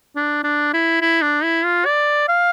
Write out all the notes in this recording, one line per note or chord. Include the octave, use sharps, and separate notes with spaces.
D4
D4
E4
E4
D4
E4
F4
D5
F5